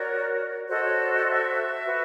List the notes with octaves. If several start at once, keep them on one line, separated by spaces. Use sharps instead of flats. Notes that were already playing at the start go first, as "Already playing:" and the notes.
Already playing: F#4 A#4 C#5 D5
F#4 A4 C5 D#5
C#5
D5
D#5
E5
F#4 B4